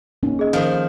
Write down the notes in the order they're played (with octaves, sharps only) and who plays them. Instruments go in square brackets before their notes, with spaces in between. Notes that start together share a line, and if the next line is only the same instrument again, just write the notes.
[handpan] A#3 C#4 D#4
[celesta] G#4 D#5
[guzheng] D#3 F3